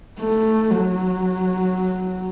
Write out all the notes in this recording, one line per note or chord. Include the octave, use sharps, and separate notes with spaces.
A3
F#3